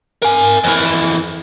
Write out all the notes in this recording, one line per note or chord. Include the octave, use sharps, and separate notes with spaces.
A#4 G#5
F2 E3